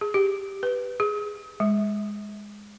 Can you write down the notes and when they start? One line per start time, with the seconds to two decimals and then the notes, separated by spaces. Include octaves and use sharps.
0.01 G#4
0.14 G4
0.63 B4
1.00 G#4
1.60 G#3